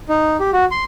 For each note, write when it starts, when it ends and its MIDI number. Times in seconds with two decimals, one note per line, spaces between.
0.09 0.37 63
0.40 0.51 67
0.53 0.65 66
0.71 0.84 84